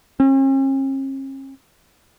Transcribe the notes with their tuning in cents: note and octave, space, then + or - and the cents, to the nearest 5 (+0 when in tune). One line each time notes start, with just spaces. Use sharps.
C#4 -45